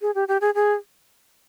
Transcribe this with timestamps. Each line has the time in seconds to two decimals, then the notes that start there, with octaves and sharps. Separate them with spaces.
0.02 G#4
0.15 G4
0.28 G4
0.41 G#4
0.55 G#4